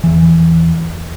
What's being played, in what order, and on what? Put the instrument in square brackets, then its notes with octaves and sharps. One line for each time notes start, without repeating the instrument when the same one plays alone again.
[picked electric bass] E2 E3